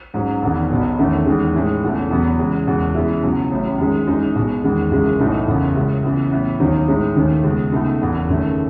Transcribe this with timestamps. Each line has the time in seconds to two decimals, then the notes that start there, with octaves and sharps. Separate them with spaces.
0.14 G#2 F#3 C#4
0.42 E1 E2 D#3
0.70 B1 B2 F#3 B3
0.98 E2 D#3 A3 C#4
1.26 E2 D#3 G#3
1.54 A2 E3 G#3 D#4
1.83 E1 E2 C#3 E3 A3
2.10 E2 B2 F#3 B3
2.38 E2 C#3 E3 G#3
2.67 F#1 E2 B2 G#3
2.94 F#2 E3 G#3 B3 E4
3.23 C#2 B2 F#3 C#4
3.51 A1 A2 F#3 C#4
3.78 F#2 D#3 G#3
4.06 F#2 E3 G#3 D#4
4.36 B1 B2 G#3
4.64 E2 D#3 G#3
4.91 F#1 F#2 E3 G#3
5.19 B1 A2 E3 A3 D#4
5.47 F#1 E2 C#3
5.75 C#2 C#3 G#3 C#4 E4
6.04 C#2 C#3 E3 B3
6.32 A2 E3 B3
6.60 D#2 D#3 F#3 B3 D#4
6.88 A2 G#3 D#4
7.16 D#2 D#3 A3
7.44 C#2 B2 G#3
7.72 C#2 B2 A3 D#4
8.00 F#1 E2 C#3
8.29 F#1 F#2 D#3 A3 C#4